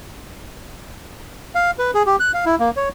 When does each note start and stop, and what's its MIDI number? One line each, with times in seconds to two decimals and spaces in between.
1.55 1.71 77
1.79 1.91 71
1.94 2.03 68
2.06 2.16 67
2.20 2.32 90
2.34 2.45 77
2.46 2.55 64
2.60 2.71 58
2.77 2.89 73